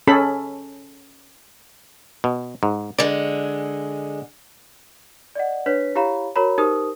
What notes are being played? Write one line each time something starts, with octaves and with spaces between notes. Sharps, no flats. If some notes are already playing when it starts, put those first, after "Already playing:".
C#4 G#4 A4 B5
B2
G#2
D3 G#3 D5
D5 D#5 F#5
D4 B4 C#5 B6
E4 G4 C#5 F5 A#5 B5
F#4 A#4 C#5 A#5 B5
D#4 G4 A#4 C5 D#6